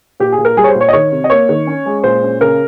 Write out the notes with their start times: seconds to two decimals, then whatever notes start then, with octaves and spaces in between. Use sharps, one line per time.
0.20 A#2 G4
0.32 G#4
0.38 A#2
0.45 A#4
0.57 G3 G#4
0.64 C#5
0.68 C5
0.75 A#2
0.81 C#5
0.89 D#5
0.93 D#3 C#5
1.12 C3
1.24 D#5
1.30 A#3 C#5
1.49 D#3
1.67 C#4
1.86 G#3
2.04 A#2 C5
2.23 C#4
2.40 C#3 A#4